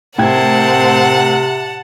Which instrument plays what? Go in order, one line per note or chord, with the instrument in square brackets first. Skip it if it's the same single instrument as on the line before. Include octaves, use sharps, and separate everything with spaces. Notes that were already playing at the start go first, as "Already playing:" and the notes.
[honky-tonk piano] A2 G5 G#6 [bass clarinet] C3 [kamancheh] C4 A#4 [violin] F#5 A5